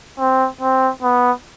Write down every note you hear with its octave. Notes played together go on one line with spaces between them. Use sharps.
C4
C4
B3